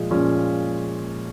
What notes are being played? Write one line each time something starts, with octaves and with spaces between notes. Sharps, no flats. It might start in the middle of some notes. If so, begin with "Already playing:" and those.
Already playing: A#2 F3 G#3
A#2 F3 G#3 C#4